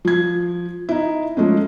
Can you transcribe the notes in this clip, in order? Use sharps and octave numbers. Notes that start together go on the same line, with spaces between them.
F3 G#6
D#4 E4
F3 G#3 A3 C#4